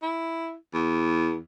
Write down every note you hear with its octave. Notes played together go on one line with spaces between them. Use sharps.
E4
E2